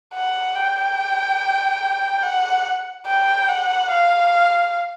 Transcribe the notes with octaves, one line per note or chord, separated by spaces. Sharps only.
F#5
G5
F#5
G5
F#5
F5